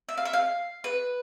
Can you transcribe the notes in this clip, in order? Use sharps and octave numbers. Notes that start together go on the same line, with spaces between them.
E5
F5
E5
F5
B4